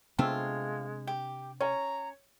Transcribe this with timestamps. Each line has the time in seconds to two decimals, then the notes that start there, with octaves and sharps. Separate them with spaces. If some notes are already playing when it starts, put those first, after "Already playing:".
0.19 C3 G#3 A3 B3 C4 D4 F4
1.07 G4
1.60 C#4 C#5 A#5